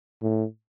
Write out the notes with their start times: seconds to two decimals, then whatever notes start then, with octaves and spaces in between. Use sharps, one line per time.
0.22 A2